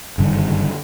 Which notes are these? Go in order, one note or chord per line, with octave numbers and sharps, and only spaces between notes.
F#1 G2 D3 D#3